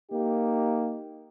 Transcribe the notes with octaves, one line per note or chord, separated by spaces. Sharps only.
A#3 D#4 G4